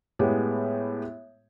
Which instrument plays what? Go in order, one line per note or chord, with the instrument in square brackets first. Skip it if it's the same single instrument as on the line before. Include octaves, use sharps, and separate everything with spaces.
[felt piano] A2 G#3 B3 G4